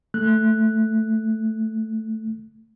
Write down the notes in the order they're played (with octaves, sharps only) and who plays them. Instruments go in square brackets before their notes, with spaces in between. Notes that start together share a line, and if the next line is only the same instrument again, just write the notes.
[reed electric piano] A3 F#6